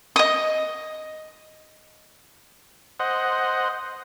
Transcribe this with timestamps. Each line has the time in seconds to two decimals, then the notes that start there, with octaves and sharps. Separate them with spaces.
0.16 D#5 D#6
3.00 C5 D#5 F#5